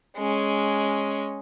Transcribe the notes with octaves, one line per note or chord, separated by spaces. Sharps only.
G#3 C#4